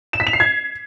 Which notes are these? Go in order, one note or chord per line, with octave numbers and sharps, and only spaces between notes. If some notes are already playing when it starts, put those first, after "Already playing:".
E7
B6
F7
C7
G#6